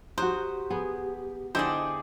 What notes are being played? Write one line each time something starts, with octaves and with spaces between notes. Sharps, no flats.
D#4 F#4 G4 C5 F#6
B3 G#4
D3 D#4 E4 G4 G#4 C5 D5